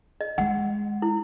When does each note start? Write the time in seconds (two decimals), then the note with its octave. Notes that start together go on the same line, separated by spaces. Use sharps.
0.21 D#5
0.38 G#3 F#5
1.02 E4